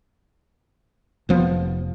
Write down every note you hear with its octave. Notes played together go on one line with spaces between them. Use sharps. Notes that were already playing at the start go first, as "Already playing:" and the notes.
F1 F3 B3